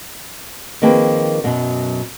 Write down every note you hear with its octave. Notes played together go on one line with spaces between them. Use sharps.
D#3 F3 A#3 C4 G#4 B4
F#2 B2 F#3